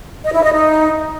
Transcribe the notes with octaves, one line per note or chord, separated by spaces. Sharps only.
D#5
E4
D#5
D#4